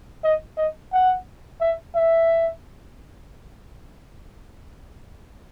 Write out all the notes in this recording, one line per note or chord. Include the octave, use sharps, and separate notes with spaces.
D#5
D#5
F#5
E5
E5